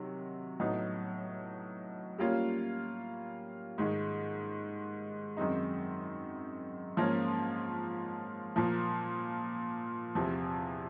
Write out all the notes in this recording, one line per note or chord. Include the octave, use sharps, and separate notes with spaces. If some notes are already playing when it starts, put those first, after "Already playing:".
Already playing: C3 D#3 F#3
A2 F#3 B3 D#4
G3 A#3 C#4 F4
G#2 D#3 G#3
F#2 D#3 G#3 C4 D#4
G#2 F3 A#3 C#4
A#2 F3 A#3
E2 C3 F3